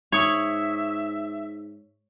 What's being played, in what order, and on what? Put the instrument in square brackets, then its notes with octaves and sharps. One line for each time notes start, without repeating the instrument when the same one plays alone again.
[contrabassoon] G#2 [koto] C#5 [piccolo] E5 [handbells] C#6 D#6 G#6